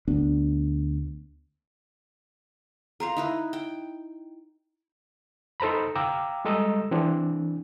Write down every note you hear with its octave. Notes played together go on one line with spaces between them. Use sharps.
D2 B3 D4
A#4 C5 F5
D#4 E4 B4
G5
D#4 A4 C5 A#5 B5
F5 G5 A#5 D6 E6
G3 G#3 A4 D#5 A#5 E6
E3 C4 D4